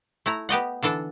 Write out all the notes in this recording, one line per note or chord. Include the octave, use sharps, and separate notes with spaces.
A3 E4 A#5
B3 G4 D#5 F#5
D3 E3 D4 A4